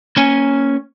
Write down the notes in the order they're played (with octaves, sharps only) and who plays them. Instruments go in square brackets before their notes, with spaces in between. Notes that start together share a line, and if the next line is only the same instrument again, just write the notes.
[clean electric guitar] A#3 C#4 G#5